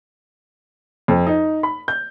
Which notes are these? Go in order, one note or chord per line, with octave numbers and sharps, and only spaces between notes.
F2
D#4
B5
G6